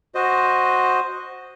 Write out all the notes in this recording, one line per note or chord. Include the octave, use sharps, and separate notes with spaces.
F#4 C5 D#5